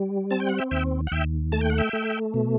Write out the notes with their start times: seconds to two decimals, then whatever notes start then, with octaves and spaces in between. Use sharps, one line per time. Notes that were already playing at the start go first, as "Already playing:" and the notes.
Already playing: G3
0.31 C4 A5
0.40 G5
0.49 F#5
0.59 E5 G5
0.71 D#2 E5 G5
1.07 F#5
1.12 D#2 E5 G5
1.52 A3 A5
1.61 G5
1.70 F#5
1.78 E5 G5
1.93 A3
2.34 B2